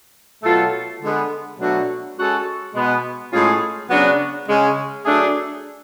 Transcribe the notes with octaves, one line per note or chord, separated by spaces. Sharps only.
B2 F#3 A3 F4 A4
D3 G#3 B3
B2 F#3 A3 D4 F#4
G#3 C#4 F#4 A4
B2 G#3 B3
A2 G#3 C#4 F4 G#4
C#3 F#3 B3 D4 F#4
C#3 G#3 C#4
F#3 A3 D4 G#4